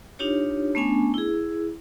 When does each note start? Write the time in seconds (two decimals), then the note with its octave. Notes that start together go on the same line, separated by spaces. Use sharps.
0.19 D4 D#4 F4 G4 C#5
0.75 A3 B3 C#4 D4 G#5
1.14 E4 G#4